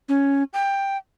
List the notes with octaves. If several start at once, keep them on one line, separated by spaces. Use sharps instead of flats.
C#4
G5